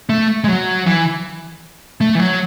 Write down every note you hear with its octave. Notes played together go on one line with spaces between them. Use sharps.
A3
G#3
F#3
E3
A3
E3
F#3